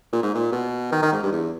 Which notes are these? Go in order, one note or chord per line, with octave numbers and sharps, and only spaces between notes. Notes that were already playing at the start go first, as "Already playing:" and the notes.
A#2
G#2
A#2
B2
D#3
D#3
G#2
G2
E2